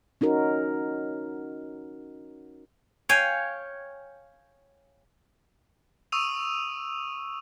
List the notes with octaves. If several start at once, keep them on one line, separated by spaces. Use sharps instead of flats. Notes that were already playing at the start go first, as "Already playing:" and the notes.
C#4 D#4 F#4 A#4
C#5 F5 G5 G#5
C#6 D#6 E6 D#7 F7